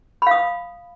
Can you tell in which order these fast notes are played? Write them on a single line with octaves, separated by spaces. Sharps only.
B5 F5 D#6